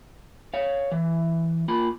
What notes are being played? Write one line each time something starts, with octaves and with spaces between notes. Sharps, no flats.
C#5 F5
E3
A#3 F4 B5